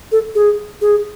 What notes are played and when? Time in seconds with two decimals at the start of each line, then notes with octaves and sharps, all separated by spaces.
0.12 A4
0.35 G#4
0.81 G#4